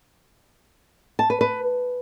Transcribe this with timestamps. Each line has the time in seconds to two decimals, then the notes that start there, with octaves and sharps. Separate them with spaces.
1.19 A5
1.30 B4
1.41 B4